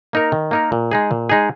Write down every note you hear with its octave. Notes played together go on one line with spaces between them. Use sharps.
A#3 D#4 A#4
D#3
A#3 D#4 A#4
A#2
G#3 D#4 G#4
A#2
G#3 D#4 G#4